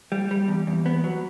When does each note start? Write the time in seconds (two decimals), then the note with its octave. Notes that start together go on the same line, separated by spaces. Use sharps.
0.12 G3
0.31 G3
0.48 E2
0.67 E2
0.86 B3
1.04 F#3